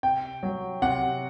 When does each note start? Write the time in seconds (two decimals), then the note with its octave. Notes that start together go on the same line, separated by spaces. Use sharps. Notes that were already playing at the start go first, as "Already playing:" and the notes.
0.03 C3 G5
0.43 F#3
0.82 C3 F#5